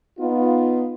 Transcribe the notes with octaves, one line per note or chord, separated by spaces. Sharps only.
B3 D#4 F4